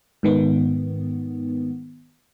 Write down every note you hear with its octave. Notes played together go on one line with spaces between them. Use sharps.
G#2 D#3 B3